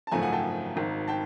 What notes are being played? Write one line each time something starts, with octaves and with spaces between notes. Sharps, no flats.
A5
G#1 F#2 C#3 F3 A3 G#5 A#5
F#5 G#5
G5 A5
G#1 G#2 D#3
G5 A5